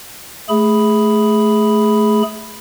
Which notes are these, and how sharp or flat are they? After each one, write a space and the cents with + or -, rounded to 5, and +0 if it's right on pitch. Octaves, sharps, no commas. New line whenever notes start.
A3 -15 G#4 +0 B5 +0